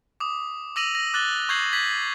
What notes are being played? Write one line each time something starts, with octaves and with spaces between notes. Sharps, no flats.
D6 D#6
D6 E6 A#6 D#7 F7 F#7
A#6
D6 F#6 A6 F#7 G7
C#6 G6 G#6 C7 F#7
G6 G#6 B6 F#7